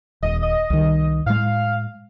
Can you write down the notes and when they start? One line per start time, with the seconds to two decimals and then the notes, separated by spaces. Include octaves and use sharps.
0.23 D#1 D#5
0.42 D#5
0.70 C2 D#3
1.26 A2 G#3 F5